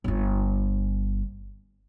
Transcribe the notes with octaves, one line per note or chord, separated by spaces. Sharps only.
G1 F4